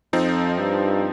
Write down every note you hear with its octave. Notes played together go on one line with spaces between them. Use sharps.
F2 F3 C4 D#4
G2